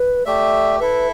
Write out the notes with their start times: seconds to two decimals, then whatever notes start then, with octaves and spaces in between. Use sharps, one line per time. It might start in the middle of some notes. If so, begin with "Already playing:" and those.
Already playing: B4
0.25 A3 G4 D5 E5
0.80 E4 A4 B4 E5